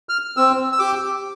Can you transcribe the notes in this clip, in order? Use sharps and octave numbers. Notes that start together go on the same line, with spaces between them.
F6
C4 E6
E6
G4 D6